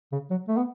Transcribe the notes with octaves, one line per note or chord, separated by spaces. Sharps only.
C#3
F#3
A3
B3